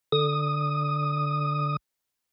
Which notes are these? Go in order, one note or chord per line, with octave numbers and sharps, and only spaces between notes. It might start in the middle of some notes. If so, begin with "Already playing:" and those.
D3 D#6